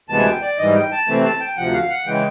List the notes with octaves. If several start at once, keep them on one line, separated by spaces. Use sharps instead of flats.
D2 C3 E3 G#3 B3 A5
G#5
G5
D5
G#2 E3 G3 D#5
G5
A5
C3 E3 A3 C4
A5
G5
D2 C3 F3 F#5
F5
F#5
C#3 E3 G#3 G5